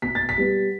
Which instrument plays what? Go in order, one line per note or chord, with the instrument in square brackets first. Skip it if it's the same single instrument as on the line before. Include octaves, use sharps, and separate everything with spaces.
[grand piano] B2 B6
A6
B6
G3 B3